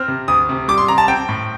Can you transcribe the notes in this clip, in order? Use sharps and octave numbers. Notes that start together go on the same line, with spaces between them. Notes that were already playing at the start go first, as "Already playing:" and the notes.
Already playing: C4 F6
C3
D2 D#6
C3
G3 D6
C6
C3 A#5
A5
C4 G5
A2